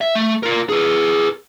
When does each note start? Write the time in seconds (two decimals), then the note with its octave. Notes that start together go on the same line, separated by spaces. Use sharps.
0.01 E5
0.15 A3
0.43 F4 A#4
0.69 G#4 B4